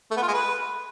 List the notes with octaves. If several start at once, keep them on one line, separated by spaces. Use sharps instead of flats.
A3
B3
F4
G#3
B4